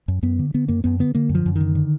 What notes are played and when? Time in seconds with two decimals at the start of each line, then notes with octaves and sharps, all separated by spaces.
0.08 F#2
0.23 F#2 B3
0.39 D3
0.54 D3 B3
0.68 F#2 A#3
0.84 F#2 B3
0.99 D3 B3
1.15 D3 A#3
1.29 F#2
1.35 F3
1.46 F#2
1.56 D#3
1.61 D3
1.75 D3